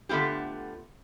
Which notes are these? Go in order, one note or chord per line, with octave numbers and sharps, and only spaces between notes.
D3 A3 B3 F4 G4